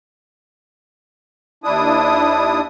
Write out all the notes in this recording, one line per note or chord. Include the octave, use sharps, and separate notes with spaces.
D#2 D4 E4 D#6